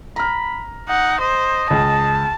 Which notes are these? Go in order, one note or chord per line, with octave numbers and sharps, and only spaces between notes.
A#5 B5 F6
D#4 F#5
C5 D#5
C#2 A5